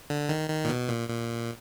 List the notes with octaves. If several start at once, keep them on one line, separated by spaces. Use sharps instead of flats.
D3
D#3
D#3
A#2
B2
A#2
A#2